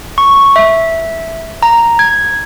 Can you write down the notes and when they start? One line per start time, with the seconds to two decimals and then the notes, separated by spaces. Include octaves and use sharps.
0.18 C#6
0.56 E5
1.63 A#5
1.99 G#6